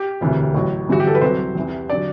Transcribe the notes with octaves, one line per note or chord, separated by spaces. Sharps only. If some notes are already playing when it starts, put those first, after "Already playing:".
Already playing: G4
E1 D2 C3 E3
A1 A2 F#3
G1 G2 E3 F#4
G4
A4
B4
C2 C3 F#3 C5
E2 C3 E3
D3 F#3 D5